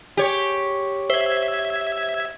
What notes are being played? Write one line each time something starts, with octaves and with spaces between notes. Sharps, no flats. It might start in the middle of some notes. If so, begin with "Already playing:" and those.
G4 C#5
C5 E5 G#6